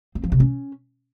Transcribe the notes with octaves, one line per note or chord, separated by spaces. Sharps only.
C4
F3
C3
C#4